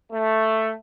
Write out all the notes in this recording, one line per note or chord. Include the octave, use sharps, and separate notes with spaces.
A3